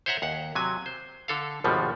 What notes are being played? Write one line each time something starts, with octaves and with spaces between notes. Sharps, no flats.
C5 C#5 E5 F#5 A#5
D#2 F#5
C3 F#3 G#5
C5
D3 A4 F5
G#1 D#2 B2 F3 G3